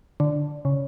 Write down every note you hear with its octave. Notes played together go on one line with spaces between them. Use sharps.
D3
C#3